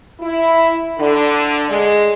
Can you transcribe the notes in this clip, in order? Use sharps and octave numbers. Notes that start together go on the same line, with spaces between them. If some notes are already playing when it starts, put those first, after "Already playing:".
E4
D3
G#3